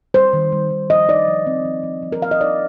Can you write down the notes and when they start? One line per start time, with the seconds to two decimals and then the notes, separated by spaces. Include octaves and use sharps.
0.14 G3 C5
0.33 D#3
0.52 G3
0.71 D#3
0.90 F3 D#5
1.08 D#4 D5
1.28 F3
1.47 C4
1.65 F3
1.84 F3
2.03 F3
2.12 A#4
2.22 F3 F5
2.31 D#5
2.41 D#4 D5